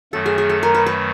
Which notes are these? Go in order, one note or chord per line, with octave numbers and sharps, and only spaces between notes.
F#2 D#3 F#3 A3 A4
G#4
G#4
A4
A#4
B4
B4